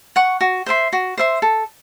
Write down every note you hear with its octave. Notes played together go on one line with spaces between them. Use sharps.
F#5 C#6
F#4
C5 E5 C6
F#4
C5 E5 C6
A4